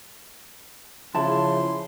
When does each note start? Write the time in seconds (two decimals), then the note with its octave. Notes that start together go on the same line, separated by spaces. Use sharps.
1.15 C#3 F3 E4 A5 C6